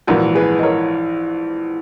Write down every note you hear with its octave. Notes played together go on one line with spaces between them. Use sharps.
A#1 G#2 E3 F#4 A#4
G#4 B4
D#5
A#4 C#5